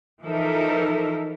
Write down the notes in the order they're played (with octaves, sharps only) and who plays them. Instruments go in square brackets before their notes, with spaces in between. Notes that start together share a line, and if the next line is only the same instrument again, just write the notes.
[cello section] E3 F3 D#4 A4 A#4 E5